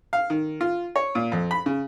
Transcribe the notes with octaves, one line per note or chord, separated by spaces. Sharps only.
F5
D#3
F4
C#5
A#2
F2
B5
C#3